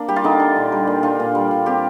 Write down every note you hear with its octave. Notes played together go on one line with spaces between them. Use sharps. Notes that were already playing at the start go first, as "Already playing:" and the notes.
Already playing: A#3 D4
G3 G4
F4
D3 D#4
D4
A#2
G3
A#2
D4 F4
A#2
G3
A#2
C4 G4